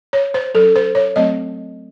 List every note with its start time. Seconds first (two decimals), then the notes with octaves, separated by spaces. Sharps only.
0.13 C#5
0.34 C5
0.54 F#3 C#4 A4
0.76 C5
0.95 C#5
1.16 F#3 A3 C4 D#5